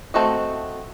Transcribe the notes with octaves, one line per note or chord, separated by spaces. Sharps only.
A3 C4 F#4 A4 D#5